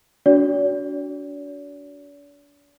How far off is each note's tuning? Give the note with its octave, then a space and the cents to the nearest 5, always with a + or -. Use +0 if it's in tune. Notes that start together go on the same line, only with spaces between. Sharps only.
D4 -35 F#4 +0 D5 -45